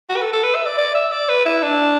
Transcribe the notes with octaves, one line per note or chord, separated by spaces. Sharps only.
F#4
B4
A4
A4
B4
E5
D5
D5
E5
D5
B4
E4
D4